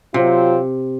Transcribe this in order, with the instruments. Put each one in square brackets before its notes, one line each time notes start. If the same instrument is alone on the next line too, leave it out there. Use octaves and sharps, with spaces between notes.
[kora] C3 [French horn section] F#3 C4 F4